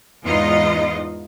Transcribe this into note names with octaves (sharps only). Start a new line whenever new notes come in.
E2 G#2 B3 D#4 F4 D#5